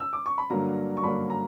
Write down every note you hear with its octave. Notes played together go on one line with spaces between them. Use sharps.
E6
D6
C#6
B5
G2 D3 F#3 A#3 A#5
C#6
G2 D3 F#3 A#3 B5
A#5